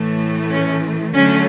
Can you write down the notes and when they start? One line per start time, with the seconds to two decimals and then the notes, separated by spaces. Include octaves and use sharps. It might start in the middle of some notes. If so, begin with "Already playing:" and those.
Already playing: A2 E3 A3
0.50 C#4
1.14 D3 F#3 A3 C#4